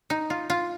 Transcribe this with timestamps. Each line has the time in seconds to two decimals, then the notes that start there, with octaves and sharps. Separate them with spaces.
0.10 D#4
0.30 F4
0.50 F4